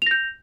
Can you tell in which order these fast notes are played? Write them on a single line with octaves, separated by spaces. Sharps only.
F7 A#6 G6